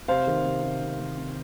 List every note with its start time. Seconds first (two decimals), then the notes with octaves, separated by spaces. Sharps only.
0.08 C3 C5 F5
0.27 D#3
0.45 C3
0.63 C3
0.81 C3
0.99 D#3
1.17 C4